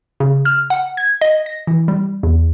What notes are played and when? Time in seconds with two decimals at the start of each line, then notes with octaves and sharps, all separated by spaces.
0.20 C#3
0.45 F6
0.70 F#5
0.97 G#6
1.21 D#5
1.46 A#6
1.67 E3
1.88 G3
2.23 E2